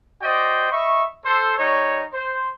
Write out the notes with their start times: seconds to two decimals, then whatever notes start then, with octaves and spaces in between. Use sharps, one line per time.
0.22 F#4 C5 D5 D#5 G5
0.72 D#5 E5 B5 C#6
1.25 A4 C5
1.58 G3 D#4 C#5
2.14 C5